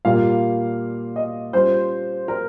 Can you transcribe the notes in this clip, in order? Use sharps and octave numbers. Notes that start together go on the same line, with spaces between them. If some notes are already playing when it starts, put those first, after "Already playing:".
A#2 G3 A#3 F4 F5
D#5
G3 C#4 F4 C5
A#4